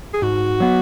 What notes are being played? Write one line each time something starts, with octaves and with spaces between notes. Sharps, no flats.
G#4
G#2 F#4
F#3 B3